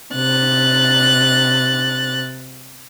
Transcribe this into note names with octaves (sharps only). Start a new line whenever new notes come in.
C3 F#6 A6